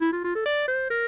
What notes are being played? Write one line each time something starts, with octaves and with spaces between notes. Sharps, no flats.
E4
F4
F4
A4
D5
C5
A#4